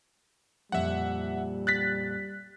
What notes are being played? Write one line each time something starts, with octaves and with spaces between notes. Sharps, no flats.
F2 A#2 G3 E5 F#5
F#6 A6 B6